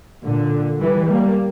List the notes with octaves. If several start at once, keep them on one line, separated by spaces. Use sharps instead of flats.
A#2 D3
E3 G3
G3 A#3